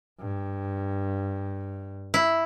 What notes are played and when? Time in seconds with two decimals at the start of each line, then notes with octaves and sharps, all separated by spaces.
0.20 G2
2.14 E4